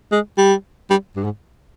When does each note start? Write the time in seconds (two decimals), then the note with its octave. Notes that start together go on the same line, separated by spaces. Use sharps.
0.12 G#3
0.38 G3
0.90 G3
1.16 G2
1.25 G#2